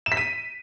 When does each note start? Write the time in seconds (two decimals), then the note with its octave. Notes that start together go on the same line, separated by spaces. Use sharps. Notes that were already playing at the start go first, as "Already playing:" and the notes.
0.06 E7
0.12 B6
0.17 D#7